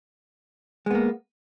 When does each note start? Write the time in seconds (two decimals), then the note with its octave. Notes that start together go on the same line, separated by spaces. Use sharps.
0.86 G#3
0.91 B3
0.95 A#3